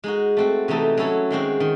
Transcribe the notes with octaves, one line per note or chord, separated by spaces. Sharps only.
G#3 D#4 F#4
A3 C4 F#4
C3 E3 A3 D#4 A4
F#3 C#4 E4 A4 C#5
D#3 G#3 C4 F#4 C5
D#3